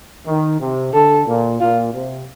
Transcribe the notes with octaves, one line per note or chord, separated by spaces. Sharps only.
D#3
C3
D3 A4
A#2
A#2 F4
C3